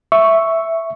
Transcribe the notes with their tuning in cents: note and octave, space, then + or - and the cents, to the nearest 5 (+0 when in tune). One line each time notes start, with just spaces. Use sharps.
E5 +0 C#6 +0